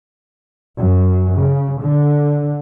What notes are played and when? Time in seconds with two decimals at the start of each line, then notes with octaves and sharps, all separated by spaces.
0.76 F#2
1.38 C#3
1.78 D3